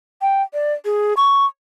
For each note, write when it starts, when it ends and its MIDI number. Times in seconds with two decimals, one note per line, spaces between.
0.22 0.42 79
0.53 0.73 74
0.85 1.13 68
1.17 1.45 85